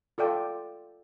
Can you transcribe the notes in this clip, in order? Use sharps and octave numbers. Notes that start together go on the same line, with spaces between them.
F4 A4 D5 G5